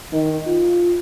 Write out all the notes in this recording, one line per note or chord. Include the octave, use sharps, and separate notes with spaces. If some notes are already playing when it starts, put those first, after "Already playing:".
D#3
F4